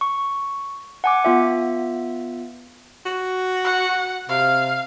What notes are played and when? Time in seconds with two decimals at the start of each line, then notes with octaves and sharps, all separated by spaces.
0.01 C#6
1.04 F#5 G#5 D6
1.25 B3 F4 E5
3.06 F#4
3.64 F#5
4.29 C3 F5